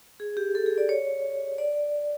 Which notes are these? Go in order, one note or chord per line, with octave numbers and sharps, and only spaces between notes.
G#4
G4
A4
G#4
D5
C#5
D5